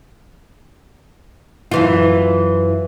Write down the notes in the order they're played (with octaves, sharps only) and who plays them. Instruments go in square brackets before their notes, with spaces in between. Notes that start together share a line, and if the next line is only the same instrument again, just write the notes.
[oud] F#2 E3 F4